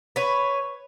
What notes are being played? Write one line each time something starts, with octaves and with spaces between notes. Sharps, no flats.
B4 C#5